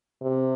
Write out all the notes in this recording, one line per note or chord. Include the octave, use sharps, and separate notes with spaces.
C3